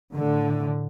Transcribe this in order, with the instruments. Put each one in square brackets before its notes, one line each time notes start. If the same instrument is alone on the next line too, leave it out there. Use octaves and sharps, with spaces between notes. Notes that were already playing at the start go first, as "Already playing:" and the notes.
[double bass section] A2 D3